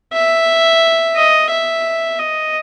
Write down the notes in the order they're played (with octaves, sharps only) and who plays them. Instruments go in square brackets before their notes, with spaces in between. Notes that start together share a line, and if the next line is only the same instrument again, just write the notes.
[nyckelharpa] E5
D#5
E5
D#5